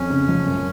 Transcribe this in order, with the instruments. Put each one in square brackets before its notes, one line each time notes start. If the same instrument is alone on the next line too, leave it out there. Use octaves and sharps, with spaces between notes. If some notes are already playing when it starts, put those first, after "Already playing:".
Already playing: [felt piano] F2 [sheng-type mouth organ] C#4
[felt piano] C#3
F3
F#2